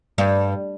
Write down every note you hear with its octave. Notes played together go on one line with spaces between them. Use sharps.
G2